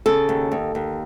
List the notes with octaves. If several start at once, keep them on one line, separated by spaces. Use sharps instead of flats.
C#3 A4
D#2
D#2
D#2